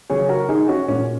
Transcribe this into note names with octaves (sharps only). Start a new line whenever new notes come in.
C#3 F#3 G#4 C#5
F#4 A#4
D#4 G#4
C#4 F#4
A#2 G#3 C#4